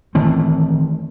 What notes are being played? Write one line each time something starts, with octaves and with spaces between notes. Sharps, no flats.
D#3 E3 A3 C4